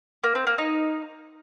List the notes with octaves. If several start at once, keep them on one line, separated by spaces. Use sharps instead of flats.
A#3
C4
A#3
D#4